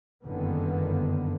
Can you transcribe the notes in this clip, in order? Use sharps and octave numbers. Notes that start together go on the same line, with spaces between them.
F#1 G2 D3 D#3 B3